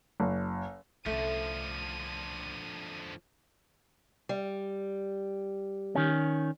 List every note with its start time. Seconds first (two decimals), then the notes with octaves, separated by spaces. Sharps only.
0.20 F#1
1.06 C2 D3 F3 A3 C#4 D#7
4.29 G3
5.95 D#3 C#4